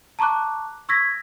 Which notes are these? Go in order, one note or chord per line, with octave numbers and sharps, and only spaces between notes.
A5 A#5 C#6 D6 F#6
C#6 E6 G#6 A#6 B6